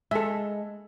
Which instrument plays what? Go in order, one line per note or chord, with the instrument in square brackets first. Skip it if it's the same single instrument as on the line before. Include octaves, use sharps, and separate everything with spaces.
[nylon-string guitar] G#3 [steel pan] A4 E5